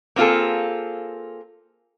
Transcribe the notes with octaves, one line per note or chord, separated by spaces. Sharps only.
A#3 C4 F4 G#4 A4